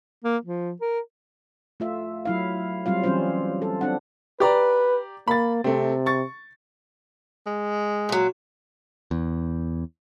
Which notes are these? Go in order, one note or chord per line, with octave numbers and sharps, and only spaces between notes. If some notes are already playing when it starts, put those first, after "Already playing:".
A#3
F3
A#4
A3 F4 E5
F#3 E4 F5
F#3 G3 C4 F4 F5
E3 G3 C4 C#4 F4 C5
A4
C4 D4 F#5
G4 B4 D5 A#5
A#3 B5 A6
C3 A3 C4
C#6 A6
G#3
A#2 F#3
E2